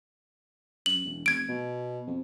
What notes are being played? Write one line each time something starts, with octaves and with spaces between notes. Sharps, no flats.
F#2 F#7
E1
F1 G#6 D7
B2
F2